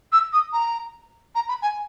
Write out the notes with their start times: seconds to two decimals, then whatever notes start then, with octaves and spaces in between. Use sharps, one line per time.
0.12 E6
0.32 D#6
0.52 A#5
1.35 A#5
1.48 B5
1.62 G#5